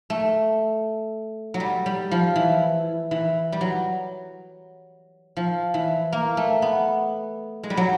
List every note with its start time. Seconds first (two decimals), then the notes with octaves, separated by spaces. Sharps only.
0.10 A3
1.54 F#3
1.60 G3
1.86 G3
2.11 F3
2.36 E3
3.11 E3
3.52 G3
3.61 F#3
5.37 F3
5.74 E3
6.12 A#3
6.37 A3
6.62 B3
7.63 G#3
7.70 G3
7.77 F#3